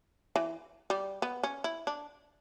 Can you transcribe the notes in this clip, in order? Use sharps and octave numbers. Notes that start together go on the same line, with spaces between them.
E3
G3
B3
C#4
E4
D4